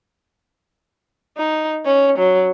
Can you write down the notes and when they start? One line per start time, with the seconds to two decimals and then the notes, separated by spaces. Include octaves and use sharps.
1.37 D#4
1.85 C#4
2.19 F#3